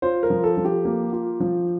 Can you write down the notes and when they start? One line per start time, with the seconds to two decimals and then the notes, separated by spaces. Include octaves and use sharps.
0.02 F4 C5
0.23 A#4
0.30 F3
0.44 A4
0.57 F3
0.65 G4
0.85 A#3
1.12 F4
1.40 F3